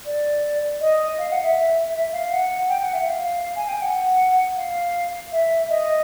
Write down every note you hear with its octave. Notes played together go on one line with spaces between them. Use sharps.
D5
D#5
F5
F#5
E5
E5
F5
F#5
G5
F#5
E5
F5
G#5
G5
F#5
F5
E5
D#5